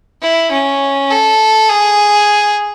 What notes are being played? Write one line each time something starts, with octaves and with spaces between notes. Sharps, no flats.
E4
C#4
A4
G#4